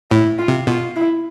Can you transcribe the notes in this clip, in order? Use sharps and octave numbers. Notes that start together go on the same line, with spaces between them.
A2 E4
F4
C3
B2 F4
E4